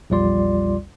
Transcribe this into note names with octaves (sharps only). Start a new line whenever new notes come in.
A#1 E2 G3 F4 D5 C6